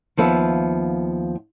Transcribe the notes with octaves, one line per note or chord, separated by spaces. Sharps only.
D#2 F3 B3 E5